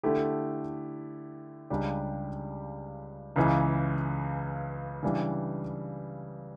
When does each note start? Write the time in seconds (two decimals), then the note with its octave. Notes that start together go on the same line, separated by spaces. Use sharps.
0.03 D3 A3 E4 G4
1.70 C#2 C#3 G3 D4 G4
3.36 C#2 C#3 E3
5.03 C#3 E3 G3 D4